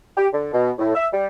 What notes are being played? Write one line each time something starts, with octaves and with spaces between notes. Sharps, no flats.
G4
D3
B2
A2
E5
G3